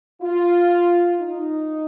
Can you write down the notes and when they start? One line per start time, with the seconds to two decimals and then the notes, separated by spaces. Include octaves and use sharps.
0.22 F4
1.20 D#4